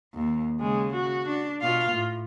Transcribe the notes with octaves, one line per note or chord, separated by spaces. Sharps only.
D#2
C#3 G#3
F#4
D4
B2 F4 F5
A2